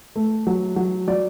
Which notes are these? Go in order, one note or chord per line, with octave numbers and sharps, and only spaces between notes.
A3
F#3
F#3
F#3 D5